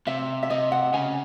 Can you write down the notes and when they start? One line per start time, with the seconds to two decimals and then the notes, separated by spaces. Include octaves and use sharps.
0.07 C3 E5
0.43 E5
0.50 C3 D#5
0.72 F#5
0.93 C#3 G#5